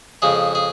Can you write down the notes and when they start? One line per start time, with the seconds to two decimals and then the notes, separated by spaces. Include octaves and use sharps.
0.22 F2 C#3 G#3 G#4
0.55 G#4